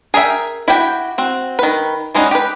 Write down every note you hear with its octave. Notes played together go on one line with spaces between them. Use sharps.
G#4 A#4 D#5 E5 G5
E4 F#4 G4 G5
C4 F#4
D#3 B4
G3 G#3 C#4 D#4 F#4
G4 B4